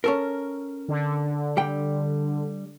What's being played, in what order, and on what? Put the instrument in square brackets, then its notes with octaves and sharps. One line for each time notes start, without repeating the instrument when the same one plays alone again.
[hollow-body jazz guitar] C#4 A4 A#4
[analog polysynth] D3
[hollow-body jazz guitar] G3 G5